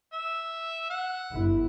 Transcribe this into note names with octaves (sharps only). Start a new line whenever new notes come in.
E5
F#5
G1 E4